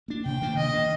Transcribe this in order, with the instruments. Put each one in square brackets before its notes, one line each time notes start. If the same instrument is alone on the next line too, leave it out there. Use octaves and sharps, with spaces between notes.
[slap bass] A#3 D4
[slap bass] C3 [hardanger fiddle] G5
[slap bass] D#3 A#3 D4
[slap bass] C3 [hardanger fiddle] D#5
[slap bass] D#3 A#3 D4